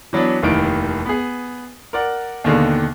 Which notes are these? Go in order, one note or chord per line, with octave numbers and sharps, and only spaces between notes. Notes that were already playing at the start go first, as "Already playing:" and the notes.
E3 F#3 B3 D4
F1 D#2 D#3 E3 D7
B3 G#4
A#4 D5 F#5
D#2 B2 D3 D#3 A#3 G#4